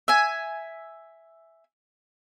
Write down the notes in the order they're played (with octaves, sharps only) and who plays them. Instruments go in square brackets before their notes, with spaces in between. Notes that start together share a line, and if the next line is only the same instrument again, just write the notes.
[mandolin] E5 G#5